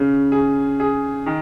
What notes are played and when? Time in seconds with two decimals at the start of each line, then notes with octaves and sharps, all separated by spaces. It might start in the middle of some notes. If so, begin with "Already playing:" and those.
Already playing: C#3
0.32 G#4
0.80 G#4
1.26 D#3